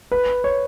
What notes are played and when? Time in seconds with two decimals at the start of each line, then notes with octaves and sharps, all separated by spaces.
0.12 B4
0.44 C#5